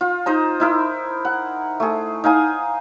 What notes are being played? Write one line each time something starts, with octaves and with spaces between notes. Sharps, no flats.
F4
D#4 C5 D#5 A#5
D#4 E4 A#4
F#5
A3 G#4
D#4 F5 G#5 D#6